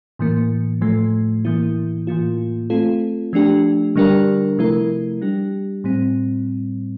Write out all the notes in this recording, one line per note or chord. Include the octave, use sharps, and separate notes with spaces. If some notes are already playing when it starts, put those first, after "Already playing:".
A2 E3 A#3
A2 F3 A3
A2 E3 A#3 E4
A2 E3 A#3 F4
A3 C4 F4 A4
F3 A3 D4 G4
D3 G3 D4 G4 A#4
C3 F3 A3 E4 A#4
G3 D4 G4
A2 G3 C4